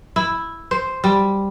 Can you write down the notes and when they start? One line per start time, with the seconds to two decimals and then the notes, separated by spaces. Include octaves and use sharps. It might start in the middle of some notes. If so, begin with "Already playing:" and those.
0.16 E4
0.71 C5
1.04 G3